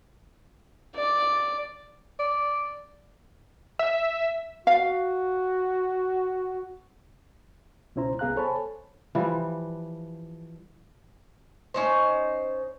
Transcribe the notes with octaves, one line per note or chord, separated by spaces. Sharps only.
D5
D5
E5
F#4 F5
C#2 B2 C#4 E4 C5 A#5
C2 B3 G#4 F5 A#5 F#6
A4 C5 C#5 G#5 A5 B5
E3 F3 G3
C#4 D#4 C5